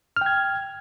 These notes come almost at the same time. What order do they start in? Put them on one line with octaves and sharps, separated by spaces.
F6 G5 G#6